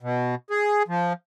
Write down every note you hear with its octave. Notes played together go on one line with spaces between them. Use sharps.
B2
G#4
F3